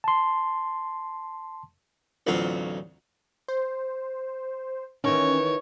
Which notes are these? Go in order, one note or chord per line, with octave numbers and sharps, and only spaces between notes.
A5 C6
A1 D2 F#3 C4 F4
C5
D#3 E3 C#4 C#5